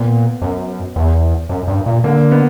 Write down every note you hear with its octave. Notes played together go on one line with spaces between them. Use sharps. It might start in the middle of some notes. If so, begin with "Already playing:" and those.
Already playing: A#2 B3
F#2
E2
F#2
G2
A#2
D3 A#3
B3